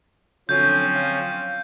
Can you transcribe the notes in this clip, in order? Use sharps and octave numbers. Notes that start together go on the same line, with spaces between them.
D3 F3 F#3 C4 C#4 C#5 G6
F5